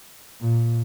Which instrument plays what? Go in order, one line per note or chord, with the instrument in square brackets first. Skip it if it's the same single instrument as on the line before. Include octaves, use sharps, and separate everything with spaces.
[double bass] A#2